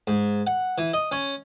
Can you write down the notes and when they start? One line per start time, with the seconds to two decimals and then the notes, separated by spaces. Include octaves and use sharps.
0.07 G#2
0.47 F#5
0.78 E3
0.94 D#5
1.12 C#4